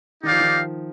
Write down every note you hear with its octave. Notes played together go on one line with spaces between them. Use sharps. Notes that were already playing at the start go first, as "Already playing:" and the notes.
D#3 D#4 G4 D5 F5
F3
D#3